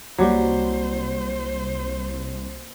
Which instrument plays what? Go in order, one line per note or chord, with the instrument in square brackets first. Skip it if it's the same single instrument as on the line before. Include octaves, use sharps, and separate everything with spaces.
[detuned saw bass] C2 [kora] F#3 G3 [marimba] A#3 D6 [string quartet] C5